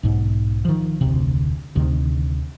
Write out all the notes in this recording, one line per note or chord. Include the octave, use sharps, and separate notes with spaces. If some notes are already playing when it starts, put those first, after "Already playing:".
B1 G#2
D#3 F3
F1 D2 C3
D2 C3 D#3